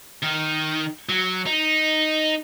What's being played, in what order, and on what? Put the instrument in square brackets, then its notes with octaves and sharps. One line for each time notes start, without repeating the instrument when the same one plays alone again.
[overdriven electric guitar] D#3
F#3
D#4